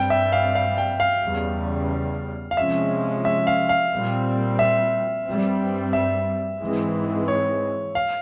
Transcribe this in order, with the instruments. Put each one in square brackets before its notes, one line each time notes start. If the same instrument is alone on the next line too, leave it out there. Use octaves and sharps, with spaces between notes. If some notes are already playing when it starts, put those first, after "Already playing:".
Already playing: [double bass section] G2 G3 C4 [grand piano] G5
[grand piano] E5
F5
F5
G5
F5
[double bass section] E2 C#3 G3
[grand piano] F5
[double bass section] C3 F3 G#3 C#4 [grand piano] E5
[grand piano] E5
F5
F5
[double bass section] A#2 G3 C4
[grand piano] E5
[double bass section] G2 G3 C4
[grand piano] E5
[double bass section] G#2 E3 G#3 C4
[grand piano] C#5
F5